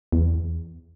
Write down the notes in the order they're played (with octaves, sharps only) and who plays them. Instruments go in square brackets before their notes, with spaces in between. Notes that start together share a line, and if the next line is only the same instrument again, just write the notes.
[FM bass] E2